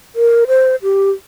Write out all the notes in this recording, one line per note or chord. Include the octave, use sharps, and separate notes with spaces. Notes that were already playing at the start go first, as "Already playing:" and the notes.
A#4
C5
G4